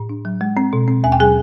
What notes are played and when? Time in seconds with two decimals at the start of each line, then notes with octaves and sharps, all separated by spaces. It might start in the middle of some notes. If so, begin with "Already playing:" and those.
Already playing: A2
0.09 D4
0.25 F#3
0.41 G#3
0.57 C4
0.73 B2
0.88 C4
1.04 D#2 G#5
1.12 G5
1.19 F#3 G#4 G#5